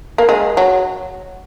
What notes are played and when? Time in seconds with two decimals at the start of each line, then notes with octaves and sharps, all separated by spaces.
0.18 A#3
0.29 G#3
0.57 F#3